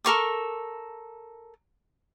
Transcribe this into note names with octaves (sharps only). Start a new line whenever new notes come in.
A4 A#4 C#6 D6